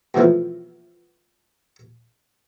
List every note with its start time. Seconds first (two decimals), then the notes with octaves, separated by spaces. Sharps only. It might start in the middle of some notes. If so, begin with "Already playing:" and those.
0.14 B2 E3 F3 A3 B4